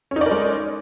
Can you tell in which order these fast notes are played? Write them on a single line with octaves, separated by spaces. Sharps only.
C#4 D#4 D5 A#4 G#3